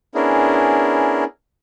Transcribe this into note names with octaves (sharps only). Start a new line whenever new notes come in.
B3 C#4 D4 E4 G#4 A#4